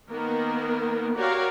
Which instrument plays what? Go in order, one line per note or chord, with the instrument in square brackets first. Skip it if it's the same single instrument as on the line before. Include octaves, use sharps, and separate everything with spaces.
[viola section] D#3 A#3 B3 A#4
F#4 G4 A#4 C#5 D5 F5